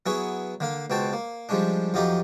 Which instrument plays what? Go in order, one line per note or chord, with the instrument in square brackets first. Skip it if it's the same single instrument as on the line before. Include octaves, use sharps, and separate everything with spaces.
[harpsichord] F#3 B3 E4 G#4 B4 C#5
D3 A#3 F5
C#2 B2 C4 F#4 G5 A5
A#3
F3 G3 G#3 C#4 D4
F2 F#3 D#4 F4 G4 D#5